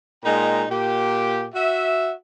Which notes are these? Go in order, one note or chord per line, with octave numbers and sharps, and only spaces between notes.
A#2 G#3 D#4 G5 A#5
A#2 G4
F#4 E5